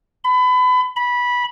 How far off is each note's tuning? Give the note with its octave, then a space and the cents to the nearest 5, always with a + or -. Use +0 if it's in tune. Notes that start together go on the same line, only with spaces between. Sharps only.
B5 +30
B5 -15